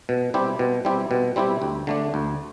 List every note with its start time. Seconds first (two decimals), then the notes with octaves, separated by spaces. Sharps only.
0.09 B2
0.34 G3 C4 E4 G4
0.59 B2
0.85 G3 C4 E4 G4
1.11 B2
1.36 G3 C4 E4 G4
1.62 D2
1.87 D3 A3 D4
2.14 D2